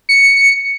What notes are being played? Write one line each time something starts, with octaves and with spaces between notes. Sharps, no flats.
C#7